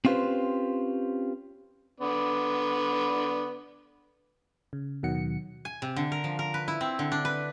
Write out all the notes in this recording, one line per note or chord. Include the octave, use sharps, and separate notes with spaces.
C4 C#4 F4 G4 B4 C5
D3 B3 D5
C#3
D#2 B2 D#3 F#3 F#5 C#7
G#5
C3
D3
A#4
F3
A#4
B4
E4
C4
D3
D4
B4